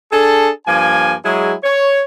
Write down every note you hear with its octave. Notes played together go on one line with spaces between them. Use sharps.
D4 G#4 A4
G2 F3 A#3 G#5
F#3 G#3 E4 G#4
C#5